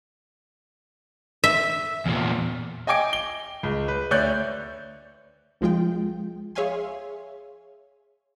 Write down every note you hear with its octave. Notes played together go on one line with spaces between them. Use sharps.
E5
E2 A#2
D#5 G5 G#5 D6 D7
G7
C#2
B4
D2 C#5 D5 F#6 G6
C2 F3 G#3 F4 G5
G#4 C#5 E5 F5 G#5 C6